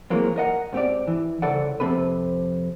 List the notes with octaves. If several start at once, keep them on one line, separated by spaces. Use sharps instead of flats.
E3 F#3 G#3 A#3 C4
A#4 D#5 F#5
G#2 C4 G4 D5
E3
C2 C#3 A4 D5 F#5
F2 C3 C4 A4 B4